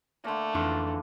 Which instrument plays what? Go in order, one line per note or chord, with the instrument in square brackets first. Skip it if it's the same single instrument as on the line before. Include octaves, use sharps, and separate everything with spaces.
[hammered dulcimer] D3 A#3 [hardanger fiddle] A3
[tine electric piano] F2 [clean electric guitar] D3 E3 [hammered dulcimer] F4